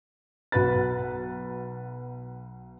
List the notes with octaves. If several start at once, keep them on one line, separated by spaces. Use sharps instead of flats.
B1 F#4 B4 B5 A6